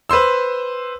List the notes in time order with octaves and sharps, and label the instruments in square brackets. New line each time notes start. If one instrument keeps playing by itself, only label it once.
[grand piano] B4 C5 C6 E6